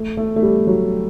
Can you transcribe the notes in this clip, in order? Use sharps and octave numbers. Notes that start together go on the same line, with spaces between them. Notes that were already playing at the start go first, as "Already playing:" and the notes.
Already playing: A3
A3
A3
G3
F#3